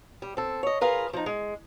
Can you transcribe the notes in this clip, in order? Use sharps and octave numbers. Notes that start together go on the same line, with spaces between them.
G3
C4 A4
C#5 D#5
F4 G#4 A#4 B4 F5
F3 D#4
G#3